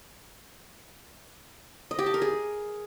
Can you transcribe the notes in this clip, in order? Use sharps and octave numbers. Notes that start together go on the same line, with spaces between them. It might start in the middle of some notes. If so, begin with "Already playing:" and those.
D#5
G4
A5
A#4
G#4